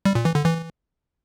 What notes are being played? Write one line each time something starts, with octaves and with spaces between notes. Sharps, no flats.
G3
A#2
E3
D3
E3